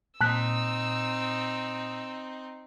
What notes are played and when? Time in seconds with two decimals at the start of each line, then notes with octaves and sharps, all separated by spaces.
0.21 A#2 C4 D#4 A5 D#6 E6 F#6 B6